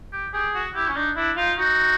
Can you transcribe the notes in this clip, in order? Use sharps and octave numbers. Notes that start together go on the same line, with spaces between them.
G4
G4 G#4
F#4
E4 G4
C#4
D4 D#4
D4 E4
D#4 F4
D#4 F#4